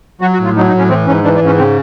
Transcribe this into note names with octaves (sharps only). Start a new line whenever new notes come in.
F#3 F#4
F#4
A2
F4
F#3 D#4
D#4
A2 C#4
E3 C4
G#2 C#4
E3 D4
D4
G#2 C#4
C#3 C4